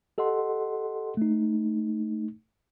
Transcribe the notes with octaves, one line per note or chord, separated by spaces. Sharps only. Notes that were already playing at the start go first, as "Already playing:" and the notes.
G4 A4 D#5 F#5 C6
A3 D#4